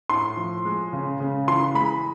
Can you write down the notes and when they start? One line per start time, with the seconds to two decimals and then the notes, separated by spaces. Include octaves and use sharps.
0.10 A2 C6
0.37 F3
0.65 G#3
0.93 C#3
1.20 C#3
1.48 E3 C6
1.75 G#3 B5